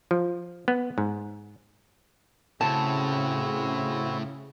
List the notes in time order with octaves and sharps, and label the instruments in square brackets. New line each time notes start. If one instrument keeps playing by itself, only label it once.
[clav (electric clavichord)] F3
B3
G#2
[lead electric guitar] A2 [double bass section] C#3 [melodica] C4 E4 F#4 [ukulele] A5